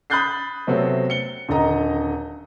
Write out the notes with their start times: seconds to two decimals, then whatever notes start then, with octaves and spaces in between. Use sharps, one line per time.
0.10 B5 D#6 F#6 G6 A6 C7
0.67 C3 F#3 A3 B3 C4
1.10 C#7 G7
1.49 D#1 D3 D#5 A#5